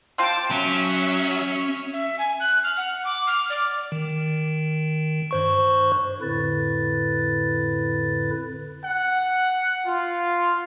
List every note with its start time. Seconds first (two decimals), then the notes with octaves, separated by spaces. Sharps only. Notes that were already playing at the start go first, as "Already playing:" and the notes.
0.18 C4 F4 G5 A5 D6
0.51 F#3 C#4 E5
1.93 E5
2.19 G#5
2.40 F#6
2.64 F6
2.77 F#5
3.05 D6
3.27 F6
3.50 D5
3.92 D#3
5.31 G2 C5 C#6
6.21 F2 A2 D3 E4 B4 A6
8.84 F#5
9.86 F4